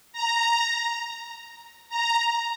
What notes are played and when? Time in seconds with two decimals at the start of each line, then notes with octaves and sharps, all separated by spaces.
0.13 A#5
1.89 A#5